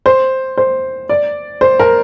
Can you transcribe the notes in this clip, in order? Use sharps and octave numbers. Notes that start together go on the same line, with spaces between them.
C5
C5
D5
C5
A#4